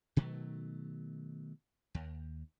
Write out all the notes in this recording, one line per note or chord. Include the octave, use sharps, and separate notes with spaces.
B2 D#3 F#3 A3
D#2